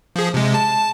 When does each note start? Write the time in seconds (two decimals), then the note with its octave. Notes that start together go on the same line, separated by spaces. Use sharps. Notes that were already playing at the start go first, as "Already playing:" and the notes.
0.16 F3 G#4
0.34 C3 G#3
0.54 A5